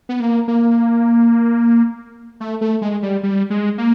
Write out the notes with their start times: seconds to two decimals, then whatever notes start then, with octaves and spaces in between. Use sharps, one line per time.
0.09 B3
0.20 A#3
0.48 A#3
2.40 A3
2.61 A3
2.82 G#3
3.03 G3
3.23 G3
3.50 G#3
3.78 A#3